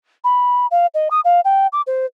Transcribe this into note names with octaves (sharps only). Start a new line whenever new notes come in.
B5
F5
D#5
D#6
F5
G5
D6
C5